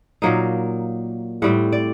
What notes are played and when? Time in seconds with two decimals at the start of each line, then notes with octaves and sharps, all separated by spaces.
0.22 A#2 F#3 A#3 D#4
1.42 A2 G3 C4 F#5
1.72 D5